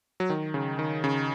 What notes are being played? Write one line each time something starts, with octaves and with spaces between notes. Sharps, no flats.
F#3
D#3
C#3
D#3
C#3